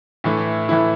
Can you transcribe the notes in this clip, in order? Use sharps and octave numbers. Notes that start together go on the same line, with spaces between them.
A2 E3 A3 E4
A2 E3 A3 E4